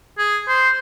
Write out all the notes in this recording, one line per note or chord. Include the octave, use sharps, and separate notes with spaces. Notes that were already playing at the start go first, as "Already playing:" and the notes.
G#4
C5